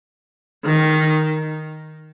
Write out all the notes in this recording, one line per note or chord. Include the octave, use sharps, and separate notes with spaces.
D#3